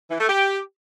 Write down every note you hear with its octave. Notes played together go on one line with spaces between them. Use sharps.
E3
A3
G4